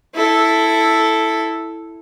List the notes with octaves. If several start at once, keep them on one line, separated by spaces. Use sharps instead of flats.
E4 A4